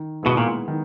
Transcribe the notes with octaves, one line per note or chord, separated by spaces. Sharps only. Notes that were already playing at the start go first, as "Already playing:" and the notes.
Already playing: D#3
B2 G#3 B3 E4
A#2
D#3